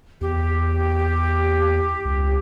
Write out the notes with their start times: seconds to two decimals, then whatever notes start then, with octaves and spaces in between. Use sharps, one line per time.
0.21 E2 G4
2.05 C#2